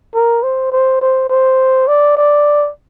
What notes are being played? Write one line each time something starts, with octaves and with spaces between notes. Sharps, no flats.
A#4
C5
C5
C5
C5
D5
D5